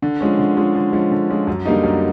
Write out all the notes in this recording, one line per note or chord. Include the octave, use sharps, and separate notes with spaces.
D3
F3 G#3 C#4
D3
F3 G#3 C#4
D3
F3 G#3 C#4
D3
F3 G#3 C#4
F#2
D3 G3 A#3 D#4
F#2